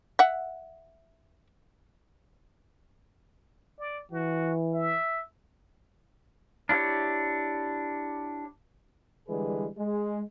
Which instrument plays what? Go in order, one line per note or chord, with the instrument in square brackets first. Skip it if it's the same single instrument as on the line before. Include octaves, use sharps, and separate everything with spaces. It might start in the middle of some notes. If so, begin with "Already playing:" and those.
[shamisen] E5 F#5
[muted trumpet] D5
[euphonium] E3 [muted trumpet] F#4
[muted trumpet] E5
[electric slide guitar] D4 E4 F4 G4 C#5
[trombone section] D3 E3 G3 G#3 G#4 B4
G#3